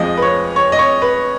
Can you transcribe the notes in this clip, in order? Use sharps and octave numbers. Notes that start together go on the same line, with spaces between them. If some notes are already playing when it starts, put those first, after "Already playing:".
Already playing: F2 F3 G#3 D#5
B4
C#5
C#5
D#5
C#5
B4